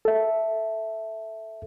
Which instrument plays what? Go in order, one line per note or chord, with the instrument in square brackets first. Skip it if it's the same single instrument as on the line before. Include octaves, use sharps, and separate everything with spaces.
[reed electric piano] A4 E5